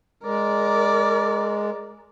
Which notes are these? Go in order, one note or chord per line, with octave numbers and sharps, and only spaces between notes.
G#3 A#4 D5